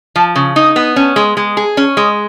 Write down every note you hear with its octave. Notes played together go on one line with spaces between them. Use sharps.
F3
C#3
D#4
B3
C#4
G#3
G#3
G#4
C#4
G#3